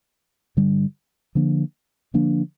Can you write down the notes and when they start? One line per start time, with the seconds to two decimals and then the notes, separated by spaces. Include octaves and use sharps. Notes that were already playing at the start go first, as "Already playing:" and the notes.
0.57 G2 D3 G3
1.35 D3 F3 A#3 D4
2.14 D3 F3 A#3 D4